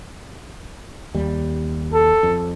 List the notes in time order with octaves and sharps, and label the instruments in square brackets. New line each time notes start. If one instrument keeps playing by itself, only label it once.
[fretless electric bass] D#2 G3
[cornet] A4
[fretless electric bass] F2